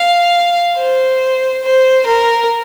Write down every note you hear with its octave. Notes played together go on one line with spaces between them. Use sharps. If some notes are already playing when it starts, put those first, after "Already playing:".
Already playing: F5
C5
C5
A#4